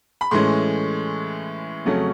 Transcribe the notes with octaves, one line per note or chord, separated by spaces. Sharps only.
B5
A2 E3 G#3 C#4 C6
F2 C#3 F#3 A3 C#4